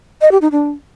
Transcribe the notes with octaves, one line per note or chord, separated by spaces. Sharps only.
D#5
G4
D#4
D4